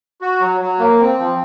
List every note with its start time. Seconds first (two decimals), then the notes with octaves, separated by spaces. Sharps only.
0.21 F#4
0.41 F#3
0.61 F#3
0.79 A#3
1.00 C4
1.19 F3